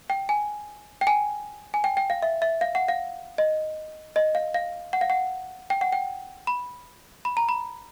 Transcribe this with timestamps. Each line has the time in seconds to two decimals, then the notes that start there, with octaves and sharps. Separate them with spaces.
0.10 G5
0.29 G#5
1.01 G5
1.07 G#5
1.74 G#5
1.84 G5
1.97 G5
2.10 F5
2.22 E5
2.42 E5
2.61 F5
2.75 F#5
2.88 F5
3.38 D#5
4.16 D#5
4.35 F5
4.54 F5
4.93 F#5
5.01 F5
5.10 F#5
5.70 G5
5.81 F#5
5.93 G5
6.47 B5
7.25 B5
7.37 A#5
7.49 B5